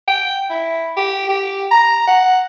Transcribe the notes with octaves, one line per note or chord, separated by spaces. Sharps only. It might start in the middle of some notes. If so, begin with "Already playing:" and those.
G5
E4
G4
G4
A#5
F#5